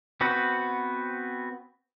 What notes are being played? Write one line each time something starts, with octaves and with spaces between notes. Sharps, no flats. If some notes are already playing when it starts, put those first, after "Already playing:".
B3 C4 F#4 B4